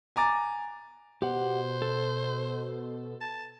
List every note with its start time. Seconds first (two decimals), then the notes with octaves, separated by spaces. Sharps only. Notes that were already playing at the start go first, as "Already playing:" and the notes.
0.16 G#5 A#5 D6 A6
1.22 B2 G4 C5 F#5
1.82 A4
3.21 A5